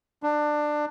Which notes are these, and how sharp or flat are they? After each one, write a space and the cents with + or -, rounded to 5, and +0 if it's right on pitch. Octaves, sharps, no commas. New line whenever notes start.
D4 +20